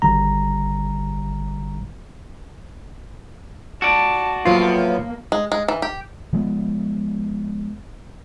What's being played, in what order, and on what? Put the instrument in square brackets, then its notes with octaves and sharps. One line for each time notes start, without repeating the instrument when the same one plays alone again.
[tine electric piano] G#1 D3 G3 A#5
[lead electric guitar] F#4 D5 [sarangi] A5
[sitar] A2 F3 B3 [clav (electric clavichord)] F#3 F4 [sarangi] A#3
[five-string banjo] G#3
G#3
E3
G4
[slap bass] F3 G#3 B3